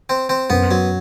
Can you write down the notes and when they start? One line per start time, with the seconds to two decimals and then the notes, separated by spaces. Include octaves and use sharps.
0.09 C4
0.29 C4
0.50 F#2 B3
0.71 F#3